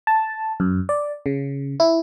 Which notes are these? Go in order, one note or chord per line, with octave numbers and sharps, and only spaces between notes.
A5
F#2
D5
C#3
E4